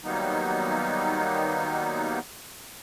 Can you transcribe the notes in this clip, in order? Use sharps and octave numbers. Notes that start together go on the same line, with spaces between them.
D#3 F#3 G3 A#3 B3 D#4